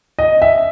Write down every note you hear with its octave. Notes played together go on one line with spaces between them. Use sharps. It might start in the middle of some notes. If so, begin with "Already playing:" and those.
D#5
E5